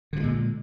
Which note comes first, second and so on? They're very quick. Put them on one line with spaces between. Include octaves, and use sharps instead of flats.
D3 E3 G#3 A#2